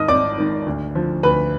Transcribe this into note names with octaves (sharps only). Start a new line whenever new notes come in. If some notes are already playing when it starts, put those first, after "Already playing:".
Already playing: G#2 D#3 D#5 D#6 F6
G#1 D5 D6
G#2 D#3
D2
D3 F3
D2 B4 B5